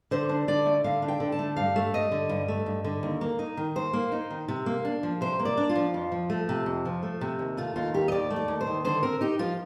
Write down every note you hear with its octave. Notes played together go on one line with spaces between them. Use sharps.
D3 C5
D4
D3 D5
A3
D3 F5
D4
G5
D3
A5
A3
G2 F5
A3
G2 D#5
D3
G2
A3
G2
D3
D#2
A#3
D#4
D#3
D#2 C5
A#3
D#4
D#3
C3
A#3
D4
F3
C3 C5
A#3
D5
D4
F4
F3
F2
F3
A3
C3
F2
F3
A3
C3
D#2
A3 F4
D#2 F4
D#3 G4
D#5
D#2 D5
A3
D5
D#2
C5
D#3
D3 C5
C4 A#4
D#4 G4
F3 F4